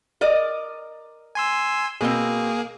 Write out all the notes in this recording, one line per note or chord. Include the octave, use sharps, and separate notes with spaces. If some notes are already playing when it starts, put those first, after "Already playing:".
A#4 D5 D#5
G#5 C6 E6
B2 A#3 C4 G#4